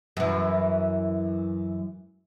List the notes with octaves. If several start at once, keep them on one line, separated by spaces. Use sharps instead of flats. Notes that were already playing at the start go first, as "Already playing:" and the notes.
F#2 E3